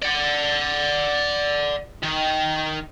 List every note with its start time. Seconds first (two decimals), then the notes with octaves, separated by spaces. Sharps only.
0.02 D5 F#5
2.03 D#3